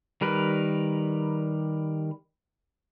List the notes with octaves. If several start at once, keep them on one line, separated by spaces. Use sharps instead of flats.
D#3 G3 A#4 B4